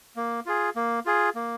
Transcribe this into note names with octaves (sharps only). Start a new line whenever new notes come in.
A#3
F4 G#4
A#3
F4 G#4
A#3